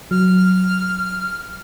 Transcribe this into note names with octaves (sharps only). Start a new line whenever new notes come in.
F#3 F6